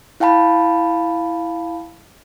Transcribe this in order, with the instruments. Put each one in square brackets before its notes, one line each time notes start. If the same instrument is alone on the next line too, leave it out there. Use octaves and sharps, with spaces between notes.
[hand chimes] E4 F5 G5 A5 B5